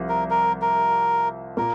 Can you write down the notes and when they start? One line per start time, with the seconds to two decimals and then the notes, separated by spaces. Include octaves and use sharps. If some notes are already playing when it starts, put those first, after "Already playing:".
Already playing: C2 F3
0.09 A#4
0.30 A#4
0.62 A#4
1.57 A#2 A#3 A#4